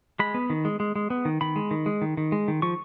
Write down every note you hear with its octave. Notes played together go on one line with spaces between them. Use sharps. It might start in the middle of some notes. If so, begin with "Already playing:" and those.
G#3 B5
B3
D#3
G#3
G#3
G#3
B3
D#3
D#3 B5
G#3
D#3
G#3
D#3
D#3
G#3
D#3
F3 C#6